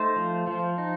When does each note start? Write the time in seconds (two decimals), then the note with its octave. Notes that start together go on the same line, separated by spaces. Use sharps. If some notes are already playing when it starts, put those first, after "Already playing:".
Already playing: A3 D#4 C5
0.16 F3
0.47 F3
0.78 D#4